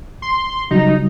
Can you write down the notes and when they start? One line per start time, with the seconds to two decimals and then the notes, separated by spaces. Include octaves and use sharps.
0.22 C6
0.71 C#3 F#3 G3 D#4